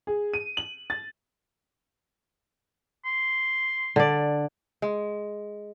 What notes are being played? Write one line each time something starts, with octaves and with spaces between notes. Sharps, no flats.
G#4
D#7
F#7
A6
C6
D3 D5
G#3